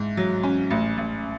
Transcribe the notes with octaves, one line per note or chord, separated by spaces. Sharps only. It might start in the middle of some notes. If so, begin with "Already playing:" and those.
Already playing: G#2 E4
F#3
C#4
A1
A1